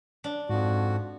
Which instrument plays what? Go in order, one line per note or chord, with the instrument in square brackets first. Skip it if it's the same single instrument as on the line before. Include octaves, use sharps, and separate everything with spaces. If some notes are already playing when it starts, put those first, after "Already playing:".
[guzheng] D4
[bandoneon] F2 F#4 [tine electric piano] G#2